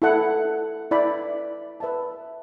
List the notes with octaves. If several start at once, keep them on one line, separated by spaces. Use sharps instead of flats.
E4 A4 F#5
E4 D5 B5
B4 E5 A5